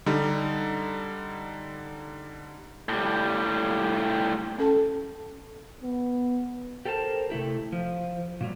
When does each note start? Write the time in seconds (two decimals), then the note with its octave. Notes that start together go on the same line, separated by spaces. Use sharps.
0.06 D3 G3 D#4
2.89 A2 G3
4.58 C#4 A4 A5
5.83 B3
6.85 G4 A4 A#4 C5 A5
7.30 C3 A3 E4 G4
7.72 F3
8.41 A#2 F#3 G3